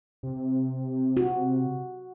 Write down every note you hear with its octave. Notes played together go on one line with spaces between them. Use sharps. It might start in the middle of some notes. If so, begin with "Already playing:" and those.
C3
F#4